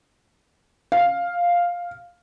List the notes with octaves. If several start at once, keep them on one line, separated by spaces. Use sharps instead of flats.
F5